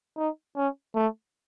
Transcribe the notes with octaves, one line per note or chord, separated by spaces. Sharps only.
D#4
C#4
A3